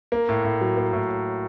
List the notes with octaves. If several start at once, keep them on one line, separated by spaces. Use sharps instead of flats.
A#3
A2
A2
F#3
A#3
A2